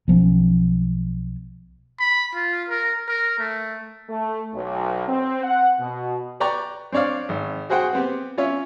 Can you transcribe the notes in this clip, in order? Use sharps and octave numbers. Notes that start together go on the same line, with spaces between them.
B1 F3 B3 C#4
B5
F4
A#4
A#4
A3
A3
B1
C4
F#5
B2
B4 D5 G5 A#5 C#6
C4 D4 C#5 D5 F5
G#1
F#4 G#4 C5 F#5 G5
B3 C4 G4
C#4 F4 C#5 E5